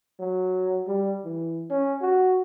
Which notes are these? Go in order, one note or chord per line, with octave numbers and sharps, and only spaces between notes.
F#3
G3
E3
C#4
F#4